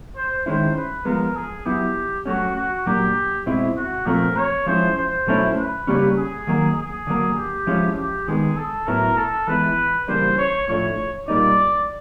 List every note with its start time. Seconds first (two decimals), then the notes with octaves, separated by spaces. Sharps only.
0.16 C5
0.46 D#3 G#3 C#4 E4 C5
0.76 B4
1.05 F3 G#3 B3 A#4
1.35 G#4
1.66 F#3 B3 E4 G4
2.26 F#3 A3 C#4 F#4
2.56 F#4
2.86 A#2 F#3 A#3 D4 G4
3.46 B2 G#3 C4 E4
3.76 F#4
4.06 A#2 F3 A3 C4 A#4
4.37 C#5
4.66 F3 G#3 C#4 E4 C5
4.97 C5
5.26 B2 F#3 A3 C#4 E4
5.57 B4
5.87 C#3 E3 G3 A#3 C#4
6.17 G#4
6.47 D#3 F#3 A#3
6.77 G#4
7.07 D3 F#3 A#3
7.36 G4
7.67 F3 G#3 C#4 E4
7.97 G4
8.27 D#3 G#3 B3 G#4
8.57 A4
8.87 A2 F#3 B3 E4 A#4
9.17 A4
9.47 E3 G#3 B3 E4 B4
10.08 C#3 E3 G3 A#3 D4 C5
10.37 C#5
10.68 A2 F3 A3 D4 C#5
11.28 A#2 G3 A#3 D#4 D5